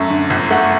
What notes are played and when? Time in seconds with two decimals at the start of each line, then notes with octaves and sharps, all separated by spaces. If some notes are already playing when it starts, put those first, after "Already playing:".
Already playing: F#2 A3 E5
0.10 D3
0.30 G1
0.51 A3 F#5